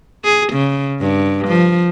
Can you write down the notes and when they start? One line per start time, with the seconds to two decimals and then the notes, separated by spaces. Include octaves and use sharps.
0.24 G#4
0.53 C#3
1.01 G2
1.47 F3